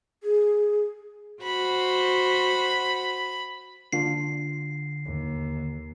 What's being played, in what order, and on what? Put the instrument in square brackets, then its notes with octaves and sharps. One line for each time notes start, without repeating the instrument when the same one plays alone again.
[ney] G#4
[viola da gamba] F#4 C5 [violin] B5
[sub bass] D3 [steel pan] A#3 D4 F4 [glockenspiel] C7
[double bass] D#2